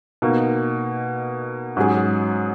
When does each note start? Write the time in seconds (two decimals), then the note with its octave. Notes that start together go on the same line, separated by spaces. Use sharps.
0.22 B2 A#3 D#4
1.77 G#2 F#3 C#4 G#4